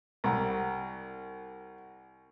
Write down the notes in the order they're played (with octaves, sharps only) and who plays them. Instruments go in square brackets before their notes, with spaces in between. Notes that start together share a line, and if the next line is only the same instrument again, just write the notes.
[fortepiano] C2 [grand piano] F#5 A#5